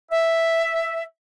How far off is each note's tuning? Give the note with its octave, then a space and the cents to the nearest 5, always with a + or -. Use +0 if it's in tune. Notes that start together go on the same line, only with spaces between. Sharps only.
E5 +0